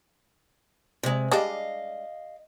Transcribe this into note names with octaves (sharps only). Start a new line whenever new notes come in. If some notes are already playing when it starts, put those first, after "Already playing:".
C3 G#3
G3 G#3 D4 D#5 F5